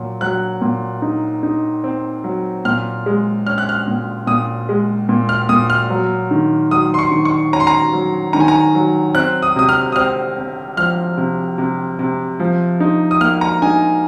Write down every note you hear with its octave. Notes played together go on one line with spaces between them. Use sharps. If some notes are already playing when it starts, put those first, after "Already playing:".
Already playing: A#2 F#3
F#3 F#6
A#2
D#4
D#4
C4
F#3
A#2 F6
G#3
C#4 F6
F#6
F6
A#2
A#2 D#6
G#3
A#2
F6
A#2 D#6
F6
F#3
D#3
F#3 D#6
C6
C#6
D#3
C#6
C#4 A#5
C6
A#5
F#3
D#3 A#5
G#5
A#5
F#3
C4 F#6
D#6
C3 D#6
F6
D#6
C4 F6
C4
F3 F6
C3
C3
C3
F3
D#4
D#6
A#3 F6
A#5
D#4 G#5